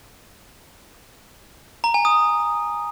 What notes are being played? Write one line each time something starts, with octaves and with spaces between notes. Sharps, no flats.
A#5
G#5
D#6